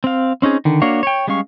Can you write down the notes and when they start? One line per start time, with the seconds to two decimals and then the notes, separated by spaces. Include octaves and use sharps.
0.04 C4 F5
0.42 C4 C#4 D#4 G#4
0.65 D3 D#3
0.82 A#3 D4 F#4 C#5 F5
1.03 C#5 G5
1.27 G3 G#3 C#4 F5 C#6